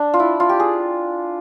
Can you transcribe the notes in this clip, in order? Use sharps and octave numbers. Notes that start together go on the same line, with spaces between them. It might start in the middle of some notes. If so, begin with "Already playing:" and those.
Already playing: D4
F4
E4
F4
G4
G#4